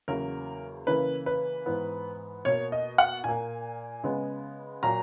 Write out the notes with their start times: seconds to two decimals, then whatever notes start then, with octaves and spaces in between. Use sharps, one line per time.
0.08 E2 C#3 F#3 A#3 A#4
0.87 C#3 E3 A#3 B4
1.26 B4
1.66 G#2 E3 B3
2.45 B2 A#3 C#5
2.72 D#5
2.98 F#5
3.24 A#2 A#3 G#5
4.04 C#3 G#3 B3
4.83 A#2 F#3 A#3 A#5